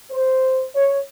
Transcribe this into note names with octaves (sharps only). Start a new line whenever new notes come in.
C5
C#5